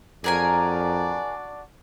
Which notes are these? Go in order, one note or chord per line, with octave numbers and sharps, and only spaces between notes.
F2 D4 F#4 G#4 A#4 D5 G#5